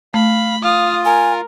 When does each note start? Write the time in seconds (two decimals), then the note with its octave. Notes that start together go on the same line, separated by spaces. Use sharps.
0.14 A3 F5 B5
0.63 F4 F5 D#6
1.05 A#4 G#5